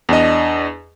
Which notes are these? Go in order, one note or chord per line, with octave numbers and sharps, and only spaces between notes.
E2 D4 D#5